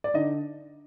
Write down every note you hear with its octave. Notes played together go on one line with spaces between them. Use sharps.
D5
D3 D#4 D#5